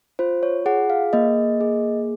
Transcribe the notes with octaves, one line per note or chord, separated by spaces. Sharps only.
F4 C5
C#5
G#4 F#5
F5
A#3 D#5
G#4